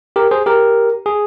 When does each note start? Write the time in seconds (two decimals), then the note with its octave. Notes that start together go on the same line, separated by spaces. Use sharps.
0.16 G4 A#4
0.31 G#4 C5
0.46 G4 A#4
1.06 G#4